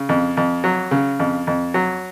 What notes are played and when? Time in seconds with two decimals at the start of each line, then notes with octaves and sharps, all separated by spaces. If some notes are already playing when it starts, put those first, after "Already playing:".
Already playing: C#3
0.09 F2
0.37 F2
0.64 F#3
0.91 C#3
1.20 F2
1.47 F2
1.74 F#3